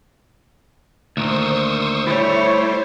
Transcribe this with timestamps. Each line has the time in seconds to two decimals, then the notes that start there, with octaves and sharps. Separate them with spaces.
1.17 D2 A#2 D#3 C5 C#6 D#6 E6
2.07 G3 A3 E4 C#5